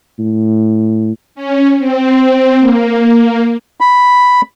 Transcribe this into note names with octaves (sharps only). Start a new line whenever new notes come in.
A2
C#4
C4
A#3
B5